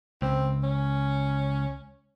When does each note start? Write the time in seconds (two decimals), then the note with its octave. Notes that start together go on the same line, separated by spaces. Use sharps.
0.22 C#2 C4
0.64 C#4